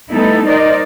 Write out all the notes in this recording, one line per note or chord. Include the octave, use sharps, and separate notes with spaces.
G3 A3 B3 D#4 E4 A4
D#4 A#4 C5 D5 D#5